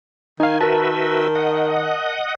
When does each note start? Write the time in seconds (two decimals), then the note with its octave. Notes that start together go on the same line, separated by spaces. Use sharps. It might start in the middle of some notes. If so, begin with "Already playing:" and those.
0.40 D#3 D#4 F5 G#5
0.61 F#4 A#4 B4 E5 A5
1.35 D#5 F#5